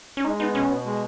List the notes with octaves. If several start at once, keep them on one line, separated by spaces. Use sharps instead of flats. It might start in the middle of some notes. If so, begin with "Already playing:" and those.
C#4
G#3 D#4
B3 D#4
B2 C#4
B2
G#3